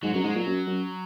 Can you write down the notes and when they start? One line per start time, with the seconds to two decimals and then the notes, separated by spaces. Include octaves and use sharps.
0.03 G#2 F#3
0.14 F#2 F#3
0.24 G#2 G#3
0.35 A#2 F#3
0.46 F#2
0.67 F#2